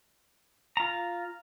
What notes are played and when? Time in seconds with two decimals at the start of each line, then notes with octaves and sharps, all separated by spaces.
0.77 F4 A#5